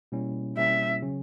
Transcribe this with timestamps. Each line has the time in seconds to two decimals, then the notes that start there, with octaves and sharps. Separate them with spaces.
0.12 B2 G3 A#3 C#4 E4
0.57 B2 G3 A#3 C#4 E4 E5
1.02 C#3 F#3 C#4